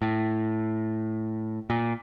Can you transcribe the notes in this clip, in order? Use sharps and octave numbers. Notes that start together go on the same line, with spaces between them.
A2
A#2